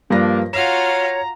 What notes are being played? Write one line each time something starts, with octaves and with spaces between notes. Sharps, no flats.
G2 F3 A#3 D4 A#6
F4 F#4 C#5 F5 A#5 E7